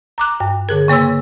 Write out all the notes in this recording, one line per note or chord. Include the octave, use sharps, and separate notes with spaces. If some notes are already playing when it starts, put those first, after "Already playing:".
A#5 D6 F#6
G2
D3 G#4 A#4
C#3 A#3 C#5 C6 E6